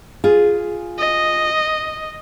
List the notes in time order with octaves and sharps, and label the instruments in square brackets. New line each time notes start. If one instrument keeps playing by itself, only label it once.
[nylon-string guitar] F4 G#4
[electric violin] D#5